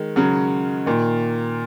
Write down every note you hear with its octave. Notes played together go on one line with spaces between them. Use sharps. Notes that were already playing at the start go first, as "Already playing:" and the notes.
Already playing: D#3 G#3
C#3 F#3
A#2 D#3